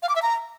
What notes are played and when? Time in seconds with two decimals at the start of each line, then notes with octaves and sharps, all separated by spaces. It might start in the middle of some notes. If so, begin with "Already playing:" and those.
0.03 F5
0.09 D6
0.16 E5
0.22 A#5